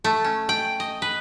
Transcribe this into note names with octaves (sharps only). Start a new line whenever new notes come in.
A3
C#4
G5
D#5
B4